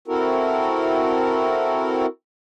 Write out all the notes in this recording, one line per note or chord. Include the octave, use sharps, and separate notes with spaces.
C4 E4 F#4 A4 A#4